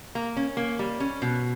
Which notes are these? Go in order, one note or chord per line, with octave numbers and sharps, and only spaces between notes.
A#3
C#4
A#3
G3
C#4
B2